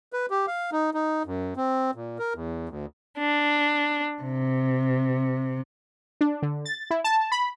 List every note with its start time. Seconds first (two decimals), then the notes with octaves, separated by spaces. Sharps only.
0.13 B4
0.30 G4
0.47 F5
0.72 D#4
0.94 D#4
1.26 F#2
1.56 C4
1.95 A#2
2.18 A#4
2.34 E2
2.69 D2
3.18 D4
4.21 C3
6.21 D4
6.42 D3
6.65 A6
6.91 E4
7.04 A5
7.32 B5